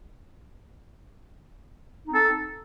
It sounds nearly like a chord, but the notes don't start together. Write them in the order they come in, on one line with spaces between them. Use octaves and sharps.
D#4 C4 A4